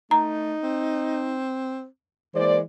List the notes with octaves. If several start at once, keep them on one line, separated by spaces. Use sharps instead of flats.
A3 D#4 A#5
C4
E3 G#3 A#3 C5 D5